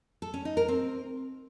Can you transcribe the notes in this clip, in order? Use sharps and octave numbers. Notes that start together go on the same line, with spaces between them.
A4
C#4
D#4
A#4
C4